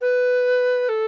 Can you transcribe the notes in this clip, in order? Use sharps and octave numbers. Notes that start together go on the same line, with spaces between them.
B4
A4